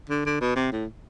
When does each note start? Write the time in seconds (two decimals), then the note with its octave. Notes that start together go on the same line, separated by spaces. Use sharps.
0.09 D3
0.26 D3
0.41 B2
0.56 C3
0.72 A2